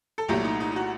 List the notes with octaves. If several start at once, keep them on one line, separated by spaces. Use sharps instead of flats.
A4
C2 A#2 F#3 A3 G4
D#4
D#4
D#4
F#4